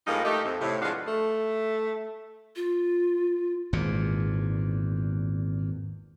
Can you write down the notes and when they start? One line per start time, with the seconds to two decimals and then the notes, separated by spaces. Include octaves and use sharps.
0.07 A2 F3 G3 G#3 A#3 D#4
0.25 A3 D#4 G4
0.45 F2
0.61 A2 C3
0.82 F3 G#3 D4 F#4 B4 F5
1.07 A3
2.56 F4
3.73 G#1 E2 A#2